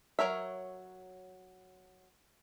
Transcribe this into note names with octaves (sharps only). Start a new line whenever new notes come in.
F#3 C4 A#4 C#5 E5